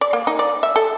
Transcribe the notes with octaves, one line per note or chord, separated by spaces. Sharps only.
D5
A#3
D#4
D5
E5
A4